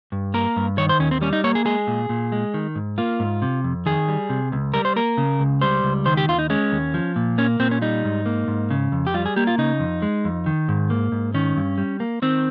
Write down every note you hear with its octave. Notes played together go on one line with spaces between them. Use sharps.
G2
A#3 A#4
G2
D#3 C#5
C5
D#2 C#4
C4
G3 C#4
D#4
A#3 C#5
G#4
G#3 G#4
A#2
A#2
G#3
D#3
G#2
A#3 F4
G#2
C3
F2
D#3 G#4
G3
C3
C#2
G3 A#4
C5
A#3 A#4
C#3
C#2
G3 C5
C#2
D#3 C5
G4
D#2 F4
D#4
G#3 C#4
D#2
F3
A#2
A#3 C#4
A#2 C4
C#4
G3 D#4
G#2
A#3
G#2
C#3
F2
G4
G3 F4
G#4
A#3 G4
F4
C#3 D#4
F2
G#3
F2
D#3
G#2
A#3
G#2
D#3 C#4
G2
G3
A#3
D#3 C4